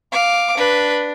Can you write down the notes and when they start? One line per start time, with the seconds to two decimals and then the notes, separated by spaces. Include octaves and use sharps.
0.12 F5 D6
0.57 D4 B4